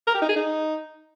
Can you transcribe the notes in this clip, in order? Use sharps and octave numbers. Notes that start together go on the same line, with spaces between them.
A#4
G4
D#4
G#4
D#4